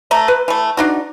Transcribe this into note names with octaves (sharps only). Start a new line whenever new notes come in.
A3 A#5
B4
E3 A3
D4 D#4 F#4